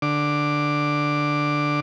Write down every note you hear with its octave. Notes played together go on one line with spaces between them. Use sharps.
D3 D6